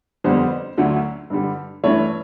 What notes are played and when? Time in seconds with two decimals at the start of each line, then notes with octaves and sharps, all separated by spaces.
0.24 F2 D3 G3 B3 C5
0.77 D2 D3 F#3 A3 C#4
1.30 G2 D3 G3
1.84 G2 E3 A3 C#4 C#5